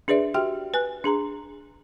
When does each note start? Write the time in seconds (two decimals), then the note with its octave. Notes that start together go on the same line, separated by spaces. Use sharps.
0.08 D4 G#4 B4 D5 E5
0.34 F#4 G4 E5 G5 C6 F6
0.74 B4 G#5 F#6
1.04 D4 G#4 A#5 C6